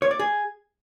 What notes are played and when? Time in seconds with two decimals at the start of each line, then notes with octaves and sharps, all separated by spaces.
0.02 C#5
0.11 D5
0.19 G#4